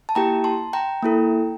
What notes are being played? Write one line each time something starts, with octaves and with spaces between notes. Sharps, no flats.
A5
A#3 E4 G4 G5 A#5
A5 C6
G5 A#5
A#3 E4 A4